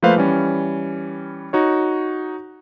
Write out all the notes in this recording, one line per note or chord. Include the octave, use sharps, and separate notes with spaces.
F3 A3 A#3 B4 C5 F5
E3 G3 C#4
D#4 F#4 C#5